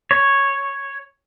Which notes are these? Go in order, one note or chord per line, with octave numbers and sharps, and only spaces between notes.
C#5